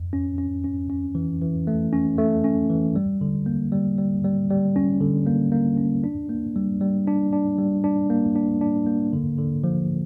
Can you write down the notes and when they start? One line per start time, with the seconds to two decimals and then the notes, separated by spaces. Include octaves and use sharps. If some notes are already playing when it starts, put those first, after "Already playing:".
Already playing: F2
0.13 C#4
0.38 C#4
0.64 C#4
0.90 C#4
1.15 E3
1.42 E3
1.67 A3
1.93 C#4
2.18 A3
2.44 C#4
2.70 E3
2.96 G3
3.21 D3
3.46 A#3
3.72 G3
3.98 G3
4.24 G3
4.50 G3
4.76 C#4
5.01 D3
5.27 A#3
5.52 A#3
5.78 C#4
6.04 D4
6.29 A#3
6.56 G3
6.81 G3
7.07 D4
7.33 D4
7.58 G3
7.84 D4
8.10 A#3
8.36 D4
8.61 D4
8.87 A#3
9.13 D3
9.38 D3
9.64 F3